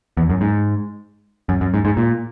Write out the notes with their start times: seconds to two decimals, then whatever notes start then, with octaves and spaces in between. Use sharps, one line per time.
0.17 E2
0.30 F#2
0.41 G#2
1.49 F#2
1.61 F#2
1.74 G#2
1.85 G#2
1.97 A#2